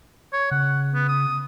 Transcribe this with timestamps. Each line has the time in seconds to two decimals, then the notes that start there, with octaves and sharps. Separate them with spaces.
0.33 C#5
0.51 C#3 F#5
0.95 B3
1.09 D#6